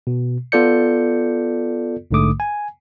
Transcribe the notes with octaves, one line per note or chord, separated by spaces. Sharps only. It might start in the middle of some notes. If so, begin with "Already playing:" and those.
B2
B3 F4 A4 D5 G6 C#7
A#1 G#2 D3 A3 D6 D#6
G#5